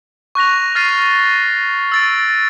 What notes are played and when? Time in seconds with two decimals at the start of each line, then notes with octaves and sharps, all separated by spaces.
0.35 C#6 F#6 A#6 F7
0.75 F6 A6 C7 D#7
1.92 E6 A6 D7